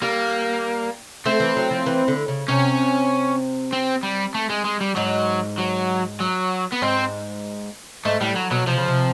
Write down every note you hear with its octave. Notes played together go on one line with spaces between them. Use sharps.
G3 A#3
A3 C4
E3
F#3
F3
E3
D3
C#3
C3 C#4
C4
G3
A3
G#3
G#3
G3
G#2 F#3
F#3
F#3
B3
G#2 C4
G#2 A3
A2 G3
F#3
B2 F#3
C3 F3
C#3
C3